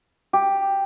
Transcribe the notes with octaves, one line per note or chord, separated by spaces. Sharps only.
G4